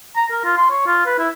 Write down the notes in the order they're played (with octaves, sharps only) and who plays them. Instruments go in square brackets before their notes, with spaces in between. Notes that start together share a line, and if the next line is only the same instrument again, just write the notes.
[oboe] A#5
A#4
F4
C6
C#5
F4
B4
E4